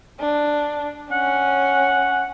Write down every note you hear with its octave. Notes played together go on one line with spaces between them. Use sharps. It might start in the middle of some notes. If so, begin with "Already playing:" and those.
D4
C#4 F#5